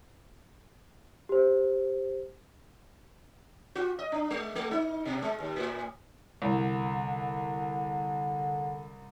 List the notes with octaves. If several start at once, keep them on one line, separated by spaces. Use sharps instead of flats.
G4 C5
F4
D#5
D4
G#3
G#3
D#4
B2
G#3
D#2
A2
C2 D3